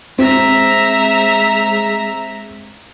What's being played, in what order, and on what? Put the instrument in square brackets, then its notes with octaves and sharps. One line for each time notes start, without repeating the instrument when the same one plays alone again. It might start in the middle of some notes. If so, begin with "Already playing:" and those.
[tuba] G#3 [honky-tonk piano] C4 [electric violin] E5 A#5